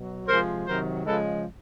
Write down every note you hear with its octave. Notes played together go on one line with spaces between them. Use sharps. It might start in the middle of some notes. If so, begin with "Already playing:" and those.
Already playing: B2 F#3
C3 F3 G#3 A#4 C5
C3 D#3 F#3 A#4 C5
C#3 F3 G#3 A4 B4